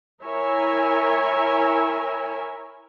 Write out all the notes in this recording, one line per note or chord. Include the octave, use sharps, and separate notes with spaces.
E4 A#4 C#5 E5 G#5